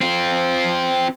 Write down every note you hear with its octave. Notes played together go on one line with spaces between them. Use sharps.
C4 F4